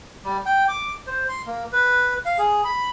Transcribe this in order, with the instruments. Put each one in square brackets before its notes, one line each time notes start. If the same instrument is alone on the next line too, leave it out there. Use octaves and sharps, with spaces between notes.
[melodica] G3
G5
D6
C5
C6
A#3
B4
F5
G#4
B5